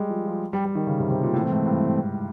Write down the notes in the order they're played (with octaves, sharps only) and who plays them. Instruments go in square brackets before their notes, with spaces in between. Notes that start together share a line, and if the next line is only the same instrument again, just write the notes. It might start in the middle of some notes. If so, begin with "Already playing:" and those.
Already playing: [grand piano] G3 G#3
F3
F3
G3
G3
D#3
C#3
C3
C3
A#2
[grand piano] A2 [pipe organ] E3
[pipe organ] A3 C4
[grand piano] G#2
G2